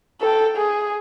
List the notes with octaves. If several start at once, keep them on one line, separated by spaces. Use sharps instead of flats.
A4 G5
G#4